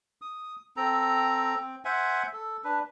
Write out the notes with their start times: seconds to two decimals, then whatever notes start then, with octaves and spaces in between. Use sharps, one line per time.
0.22 D#6
0.77 C4 A4 A#5
1.56 C4
1.85 C5 E5 F#5 G#5
2.33 A4
2.64 D4 B4